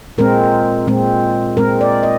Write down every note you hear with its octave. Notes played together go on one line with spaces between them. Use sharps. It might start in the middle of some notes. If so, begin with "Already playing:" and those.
A#2 G#3 C4 A#4
A#2 G#3 C4
A#2 G#3 C4 A#4
D5
D#5